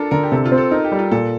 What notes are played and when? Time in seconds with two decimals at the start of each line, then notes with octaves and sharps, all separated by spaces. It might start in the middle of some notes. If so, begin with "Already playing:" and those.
Already playing: D4 F4 A4 A#4
0.11 D3 A#4
0.23 G4
0.32 C3 A4
0.45 F4
0.52 C4
0.58 A4
0.71 D#4 A#4
0.84 G4
0.92 G3
0.99 F4
1.11 A#2 A4